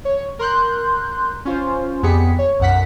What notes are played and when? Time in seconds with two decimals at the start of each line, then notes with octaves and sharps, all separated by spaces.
0.05 C#5
0.39 A#4 C6 F#6 G6
1.45 C#4 F4 C5
2.03 F2 B3 G4 G#4 B6 C#7
2.39 C#5
2.59 B1 F#2 F#5 B6